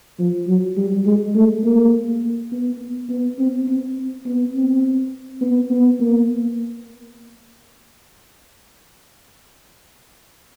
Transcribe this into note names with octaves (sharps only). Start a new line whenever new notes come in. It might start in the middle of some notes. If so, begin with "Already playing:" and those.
F3
F#3
G3
G#3
A3
A#3
B3
B3
C4
C4
B3
C4
B3
B3
A#3